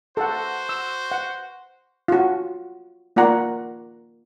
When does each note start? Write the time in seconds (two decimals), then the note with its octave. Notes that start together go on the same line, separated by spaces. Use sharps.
0.17 F#4 A4 C5 F#5
0.69 E6
1.12 F#5
2.08 F4 F#4
3.16 A#3 F4 D5 F#5 A#5